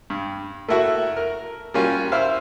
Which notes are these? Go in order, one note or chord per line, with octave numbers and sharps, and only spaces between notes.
G2
A3 A#3 E4 F#4
A#4
G3 A#3 C#4 F4 F#4
E4 C5 E5 F5